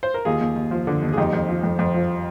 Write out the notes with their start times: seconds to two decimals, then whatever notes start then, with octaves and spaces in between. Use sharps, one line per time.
0.03 C5
0.14 A#4
0.25 D#2 F4 G#4
0.41 D#2
0.56 D#2
0.71 F3
0.87 D3
1.02 D#2
1.13 G#4
1.18 F2 D#4 G4
1.33 F2
1.49 F3
1.64 F2
1.79 F2
1.94 F3